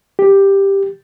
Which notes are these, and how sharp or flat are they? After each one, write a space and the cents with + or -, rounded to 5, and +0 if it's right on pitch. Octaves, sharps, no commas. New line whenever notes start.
G4 +5